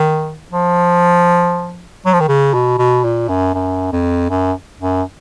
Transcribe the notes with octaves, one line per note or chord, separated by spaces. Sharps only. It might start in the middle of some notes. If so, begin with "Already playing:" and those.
Already playing: D#3
F3
F#3
F3
D#3
C#3
B2
B2
A#2
F#2
F#2
F2
F#2
F#2